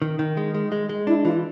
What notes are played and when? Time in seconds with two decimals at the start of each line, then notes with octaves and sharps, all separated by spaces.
0.02 D#3
0.19 D#3
0.37 G#3
0.55 G#3
0.72 G#3
0.89 G#3
1.07 D4 E4
1.25 E3 F4